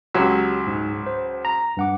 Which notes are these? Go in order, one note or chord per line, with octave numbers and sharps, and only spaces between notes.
C#2 F#3 G4 C#5 E6
G#2
C5
A#5
G2 F#5 D6